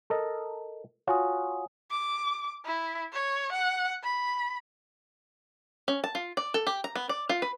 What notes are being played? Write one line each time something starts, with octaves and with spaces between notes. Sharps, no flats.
A4 A#4 D#5
F4 F#4 C#5 G#5 D#6
D6
E4
C#5
F#5
B5
C#4
A5
F4
D5
A4
G4
A#5
B3
D5
F4
B4